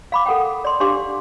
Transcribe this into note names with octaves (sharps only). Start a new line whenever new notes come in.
F5 B5 D6
A4 A#4 F#5 G5
D5 C6
D4 G4 F5 C6 D6